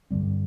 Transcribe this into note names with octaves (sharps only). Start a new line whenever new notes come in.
G2 D3 G3 C4